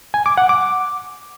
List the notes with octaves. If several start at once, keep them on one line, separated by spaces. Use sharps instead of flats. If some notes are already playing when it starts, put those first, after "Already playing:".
G#5
D6
F#5
D6